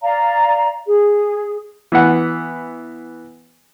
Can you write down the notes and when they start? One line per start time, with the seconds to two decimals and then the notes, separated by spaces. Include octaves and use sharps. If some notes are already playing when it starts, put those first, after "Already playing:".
0.02 D5 F5 A#5
0.86 G#4
1.92 E3 B3 F#5